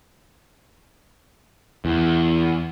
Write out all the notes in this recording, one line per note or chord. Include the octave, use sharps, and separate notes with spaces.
E2